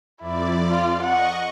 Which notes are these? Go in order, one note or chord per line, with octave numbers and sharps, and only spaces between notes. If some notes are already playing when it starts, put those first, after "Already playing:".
F2 E4 D5
F4
D#5 F#5 C#6